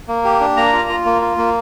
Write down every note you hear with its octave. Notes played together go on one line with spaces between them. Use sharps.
A#3
G4
D4
A#3 A#5
F4
F4
A#3
F4
A#3